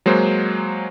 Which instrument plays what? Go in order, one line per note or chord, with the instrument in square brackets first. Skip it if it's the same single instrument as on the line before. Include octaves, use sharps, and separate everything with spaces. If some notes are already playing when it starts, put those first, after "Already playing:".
[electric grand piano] F#3 G#3 A#3 C5